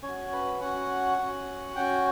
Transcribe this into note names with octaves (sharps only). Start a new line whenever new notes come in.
C#4 C#5
F#4
B4
C#4 F#4 F#5
C#4 F#4
C#4 F#4 G5